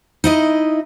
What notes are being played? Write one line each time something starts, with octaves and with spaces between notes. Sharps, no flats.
D#4 E4 D#5